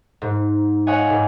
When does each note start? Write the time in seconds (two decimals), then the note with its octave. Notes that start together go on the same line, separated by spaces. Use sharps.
0.22 G#2
0.87 C#5 D#5 F5 F#5 G#5
1.10 G#2